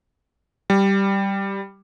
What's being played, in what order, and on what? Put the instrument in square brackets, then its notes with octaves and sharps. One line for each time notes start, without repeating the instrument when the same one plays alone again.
[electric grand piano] G3